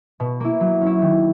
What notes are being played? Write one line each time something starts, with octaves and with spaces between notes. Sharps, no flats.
B2
A#3 E4
F#3
C#4 E4
D#3